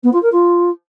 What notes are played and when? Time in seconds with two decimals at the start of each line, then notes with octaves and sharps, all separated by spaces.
0.03 B3
0.12 F4
0.22 A#4
0.31 F4